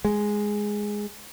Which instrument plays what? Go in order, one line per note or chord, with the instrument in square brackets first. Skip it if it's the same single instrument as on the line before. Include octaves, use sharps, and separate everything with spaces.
[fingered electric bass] G#3